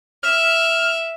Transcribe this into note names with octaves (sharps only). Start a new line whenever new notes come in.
E5 F6